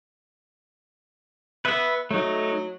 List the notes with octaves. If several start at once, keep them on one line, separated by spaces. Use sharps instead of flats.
B3 B4 E5
F#3 A3 D#4